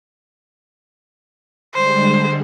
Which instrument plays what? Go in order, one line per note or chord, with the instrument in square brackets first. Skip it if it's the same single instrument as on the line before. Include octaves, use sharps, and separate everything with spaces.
[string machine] D3 G3 G#3 [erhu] C5